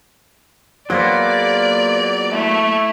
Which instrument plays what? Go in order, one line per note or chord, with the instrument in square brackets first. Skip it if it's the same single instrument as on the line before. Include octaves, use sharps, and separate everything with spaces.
[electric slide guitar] F#3 A#3 B3 [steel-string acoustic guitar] F4 G#4 C5 [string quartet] D5
[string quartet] A3 [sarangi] E4